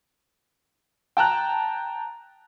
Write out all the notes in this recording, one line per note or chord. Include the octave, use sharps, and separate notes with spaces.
G5 A5 A#5 F#6